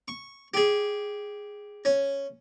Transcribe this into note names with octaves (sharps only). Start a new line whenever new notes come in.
C#6
G4 G#4
C#4